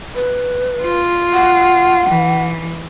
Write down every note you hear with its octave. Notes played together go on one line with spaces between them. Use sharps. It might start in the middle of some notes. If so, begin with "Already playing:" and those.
B4
F4
F#5
E3